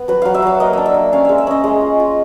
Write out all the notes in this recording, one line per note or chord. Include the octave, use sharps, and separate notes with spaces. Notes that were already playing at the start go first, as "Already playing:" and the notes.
Already playing: B3
F#3 B4
F#3 F5
E5
F#3 F5
A#3 D#5
D4 E5
E5
A#3
C#4 F5
G#3 E5
E5
C#4 D#5
G#3
F4
F4